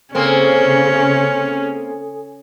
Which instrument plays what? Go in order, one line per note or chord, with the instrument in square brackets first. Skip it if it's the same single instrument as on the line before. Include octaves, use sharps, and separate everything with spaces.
[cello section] C#3 [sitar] A#3 C4 [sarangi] C#4 [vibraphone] A4 G#5 D#6